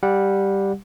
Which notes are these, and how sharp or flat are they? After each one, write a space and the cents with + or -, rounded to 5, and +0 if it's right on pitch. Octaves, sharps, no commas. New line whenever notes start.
G3 +0 G4 +0 F#5 -20